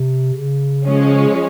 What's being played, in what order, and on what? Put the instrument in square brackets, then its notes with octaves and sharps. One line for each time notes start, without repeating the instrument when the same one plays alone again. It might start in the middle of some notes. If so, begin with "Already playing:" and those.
Already playing: [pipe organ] C3
C#3
[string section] F3 G#3 C#4